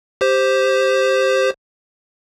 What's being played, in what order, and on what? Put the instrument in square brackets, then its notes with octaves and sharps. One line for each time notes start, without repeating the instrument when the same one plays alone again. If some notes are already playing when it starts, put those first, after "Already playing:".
[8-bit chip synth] G4 C5